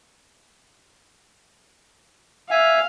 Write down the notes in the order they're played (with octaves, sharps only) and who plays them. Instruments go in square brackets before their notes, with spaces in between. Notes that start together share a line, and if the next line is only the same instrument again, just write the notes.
[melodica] E5 G#5 [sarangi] F5